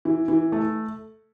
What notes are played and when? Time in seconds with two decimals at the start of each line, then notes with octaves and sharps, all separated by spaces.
0.05 E3
0.28 E3
0.52 A3